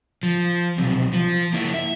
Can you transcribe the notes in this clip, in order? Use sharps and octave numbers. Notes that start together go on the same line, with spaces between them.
F3
B1 C3
F3
A#3 E4
E5